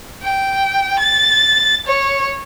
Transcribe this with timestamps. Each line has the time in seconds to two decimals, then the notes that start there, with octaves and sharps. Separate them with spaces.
0.23 G5
0.99 A6
1.87 C#5